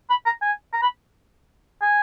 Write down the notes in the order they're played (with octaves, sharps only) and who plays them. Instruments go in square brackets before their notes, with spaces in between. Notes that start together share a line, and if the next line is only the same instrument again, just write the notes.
[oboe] B5
A#5
G#5
A#5
B5
G#5